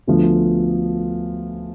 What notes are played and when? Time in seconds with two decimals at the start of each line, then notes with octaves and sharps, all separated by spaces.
0.07 D2 D3 F3 B3